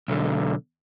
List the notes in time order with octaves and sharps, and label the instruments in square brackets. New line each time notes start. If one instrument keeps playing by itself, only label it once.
[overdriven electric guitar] B1 D3